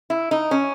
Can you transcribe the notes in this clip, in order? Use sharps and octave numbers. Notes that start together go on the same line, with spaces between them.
E4
D#4
C#4